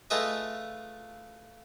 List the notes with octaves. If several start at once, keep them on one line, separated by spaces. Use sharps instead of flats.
A3 F4 G#4 B4 D#5 E5